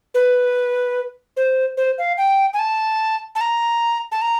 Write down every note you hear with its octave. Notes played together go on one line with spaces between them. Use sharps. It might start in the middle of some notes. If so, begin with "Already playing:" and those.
B4
C5
C5
F5
G5
G#5
A5
A5
A#5
A5
A#5